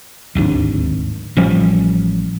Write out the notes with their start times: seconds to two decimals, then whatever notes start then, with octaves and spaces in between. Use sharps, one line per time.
0.35 D1 G#1 D#2 D4
1.37 A1 F3 G3 C#4